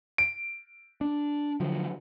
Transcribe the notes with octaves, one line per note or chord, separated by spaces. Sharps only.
D7
D4
D3 F3 F#3